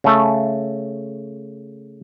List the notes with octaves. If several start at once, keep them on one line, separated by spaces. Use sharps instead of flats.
C#3 A3